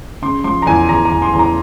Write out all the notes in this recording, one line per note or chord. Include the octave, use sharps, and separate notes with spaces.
C#3 C6
F3 C6
A#5
E2 G#5
E2 A#5
A#5
E2
C6
E2
A#5